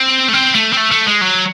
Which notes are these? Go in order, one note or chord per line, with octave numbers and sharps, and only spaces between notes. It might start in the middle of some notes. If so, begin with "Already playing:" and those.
Already playing: C4
A3
C4
A3
C4
A3
A3
G#3
F#3